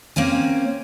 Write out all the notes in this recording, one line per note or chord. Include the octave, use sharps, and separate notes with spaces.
A#3 C4 C#4 G#5